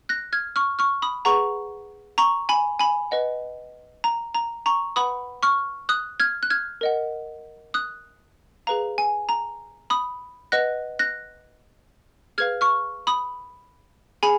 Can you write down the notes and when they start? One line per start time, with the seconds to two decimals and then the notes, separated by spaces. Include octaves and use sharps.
0.09 F#6 A#6
0.33 F6 G#6
0.56 C#6 F6
0.79 C#6 F6
1.02 B5 D#6
1.25 G#4 B4 F#5 A#5 C#6
2.18 A#5 C#6
2.49 G#5 B5
2.80 G#5 B5
3.11 B4 D#5 F#5
4.04 A#5
4.35 A#5
4.66 A#5 C#6
4.96 B4 F#5 B5 D#6
5.43 C#6 F6
5.89 D#6 F#6
6.20 F6 G#6
6.43 F#6
6.50 F6 G#6
6.81 A#4 D#5 F#5
7.74 D#6 F#6
8.67 G#4 B4 F5 A#5
8.98 G#5
9.29 A#5
9.90 B5 D#6
10.52 B4 D#5 F#5 F#6 A#6
10.99 F#6 A#6
12.38 G#4 B4 F5 F6 G#6
12.61 C#6 F6
13.07 B5 D#6
14.23 G#4 G#5 B5